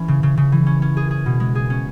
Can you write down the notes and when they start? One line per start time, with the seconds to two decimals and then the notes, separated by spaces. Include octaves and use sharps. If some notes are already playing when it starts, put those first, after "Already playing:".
Already playing: E3 C#4
0.08 C#3
0.23 C#3
0.37 C#3
0.52 E3
0.67 C#4
0.82 C#4
0.97 G#4
1.11 G#4
1.26 B2
1.40 G#3
1.55 G#4
1.70 C#4